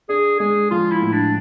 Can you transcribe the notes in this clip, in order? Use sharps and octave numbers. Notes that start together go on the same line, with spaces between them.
D4 G#4
G#3 G#4
F3 F4
E4
A2
D4